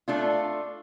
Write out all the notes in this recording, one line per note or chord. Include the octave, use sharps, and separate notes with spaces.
A3 D4 F4